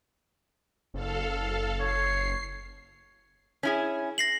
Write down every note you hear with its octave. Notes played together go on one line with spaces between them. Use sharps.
F#1 A4 F5
C#5 C7
C#4 E4 G#4
A#6 C7 F#7